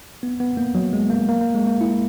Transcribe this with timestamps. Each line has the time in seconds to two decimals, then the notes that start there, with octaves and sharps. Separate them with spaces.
0.23 B3
0.40 B3
0.57 A#3
0.75 F#3
0.93 G#3
1.10 A#3
1.29 A#3
1.41 A#3
1.55 G#3
1.67 A#3
1.81 E4